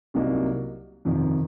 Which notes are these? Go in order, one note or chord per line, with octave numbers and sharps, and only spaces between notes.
C2 C3 F#3 A#3 D#4
F2 C3 D#3